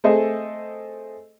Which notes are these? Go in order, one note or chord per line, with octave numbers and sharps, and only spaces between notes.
A3 C4 G#4 A4 D#5